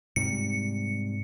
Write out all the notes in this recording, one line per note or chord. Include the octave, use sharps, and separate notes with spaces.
G#2 C3 G3 C#7